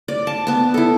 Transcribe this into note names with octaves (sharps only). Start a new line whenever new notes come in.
D5
A5
B3 A5
E4 A4